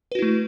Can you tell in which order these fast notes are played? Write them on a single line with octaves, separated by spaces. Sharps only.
B4 F#4 E4 A3